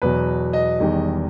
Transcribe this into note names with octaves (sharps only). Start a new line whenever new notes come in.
E2 B2 F#3 B4
D#5
E1 E2 D#3 G3